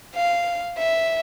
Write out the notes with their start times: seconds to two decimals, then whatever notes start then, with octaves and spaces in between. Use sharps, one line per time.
0.15 F5
0.78 E5